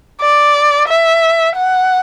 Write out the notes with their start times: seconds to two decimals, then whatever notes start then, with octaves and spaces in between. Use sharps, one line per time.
0.22 D5
0.89 E5
1.56 F#5